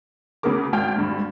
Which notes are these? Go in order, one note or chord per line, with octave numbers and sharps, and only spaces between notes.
D2 C#3 B3 G#4 A#4 D6
G#1 G5 F6
G#1 D2 G2